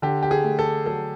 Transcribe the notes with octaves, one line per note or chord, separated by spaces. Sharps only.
D3 G4
G4
G#4
A3
A4
F#3 A4